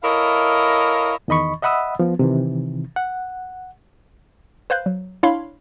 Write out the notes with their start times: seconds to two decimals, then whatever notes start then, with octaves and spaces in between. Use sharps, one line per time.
0.03 E4 A4 A#4 C#5 D#5 F5
1.28 E2 D#3 D#5 B5 C#6
1.62 D#5 E5 F#5 B5 D#6 E6
1.99 F3 B3
2.19 C3 D#3 E3
2.96 F#5
4.70 B4 C5 F5 F#6 G6
4.86 F#3
5.23 D4 E4 C#5 F5 B5 C6